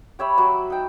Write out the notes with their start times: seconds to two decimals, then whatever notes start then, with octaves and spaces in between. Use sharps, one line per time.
0.19 G4 C#5 E5 B5
0.38 F#3 D6
0.70 D#4 G5